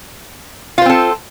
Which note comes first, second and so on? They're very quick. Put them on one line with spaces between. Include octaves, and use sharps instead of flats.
F4 C5 C4 A4